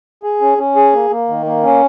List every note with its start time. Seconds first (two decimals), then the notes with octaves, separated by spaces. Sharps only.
0.23 G#4
0.41 C#4
0.58 C#4
0.76 G#4
0.93 A#3
1.10 A#3
1.29 D#3
1.46 A#3
1.63 C#4